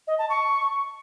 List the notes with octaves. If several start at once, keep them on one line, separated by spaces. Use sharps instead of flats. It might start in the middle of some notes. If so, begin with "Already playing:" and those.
D#5
A5
C#6